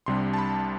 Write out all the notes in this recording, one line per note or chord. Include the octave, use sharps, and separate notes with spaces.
C2 C3 G3 D4 C6
A5
B5